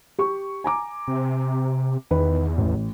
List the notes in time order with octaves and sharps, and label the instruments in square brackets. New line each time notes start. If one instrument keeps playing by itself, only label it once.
[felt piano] G4 C#6
G#5 A#5 D6
[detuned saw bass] C3
[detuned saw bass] E2 [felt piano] D#3 B4
[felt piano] A1